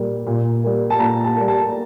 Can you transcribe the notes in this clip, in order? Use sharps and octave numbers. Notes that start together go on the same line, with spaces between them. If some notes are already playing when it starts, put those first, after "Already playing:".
Already playing: A#2 G3 A#3
A#2
G3 A#3
A5
A#2 A#5
A5
G3 A#3
A5